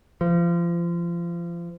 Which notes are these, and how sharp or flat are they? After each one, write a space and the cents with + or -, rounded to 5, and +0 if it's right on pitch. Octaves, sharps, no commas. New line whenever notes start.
F3 -30